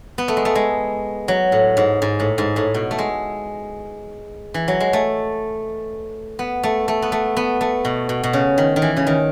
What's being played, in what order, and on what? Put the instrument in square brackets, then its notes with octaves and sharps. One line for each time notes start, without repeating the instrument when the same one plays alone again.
[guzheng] B3
A3
G#3
A3
G#3
F#3
A2
G#2
G#2
A2
G#2
A2
B2
A3
G#3
E3
F#3
G#3
A3
B3
A3
A3
B3
A3
B3
A3
B2
B2
B2
C#3
D#3
D#3
E3
C#3
D#3